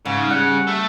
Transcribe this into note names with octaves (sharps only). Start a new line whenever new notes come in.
G#2 C#3
G3 F#5
A3 A4